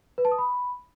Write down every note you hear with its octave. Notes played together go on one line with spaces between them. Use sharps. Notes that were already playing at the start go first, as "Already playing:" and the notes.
B4
A5
D#6
B5